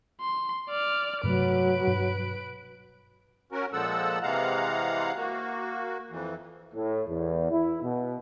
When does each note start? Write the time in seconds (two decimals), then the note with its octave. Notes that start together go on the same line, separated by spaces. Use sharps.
0.21 C6
0.69 D5 F6
1.23 G2 C3 F#3 A3 B4 D7
1.87 G2 B2
3.52 C#4 F#4 A#4
3.73 A#2 F3 G#3 A4 F#5 E6
4.23 C3 E3 G#3 F5 F#5 A#5
5.17 A#3 F#4
6.11 F2 E3
6.75 A2
7.08 E2
7.51 E4
7.83 B2